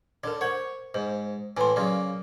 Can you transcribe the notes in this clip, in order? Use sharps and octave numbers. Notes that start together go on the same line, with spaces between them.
D3 A#4 C#5
C5 C#5 F#5
G#2 C5
A2 E3 G#5 C6
C#3 F#3 A#3 D5